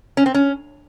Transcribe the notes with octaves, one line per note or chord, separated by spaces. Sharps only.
C#4
C4
C#4